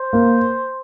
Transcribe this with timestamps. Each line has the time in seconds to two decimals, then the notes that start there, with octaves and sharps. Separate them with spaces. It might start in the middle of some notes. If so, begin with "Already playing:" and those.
Already playing: C5
0.13 A#3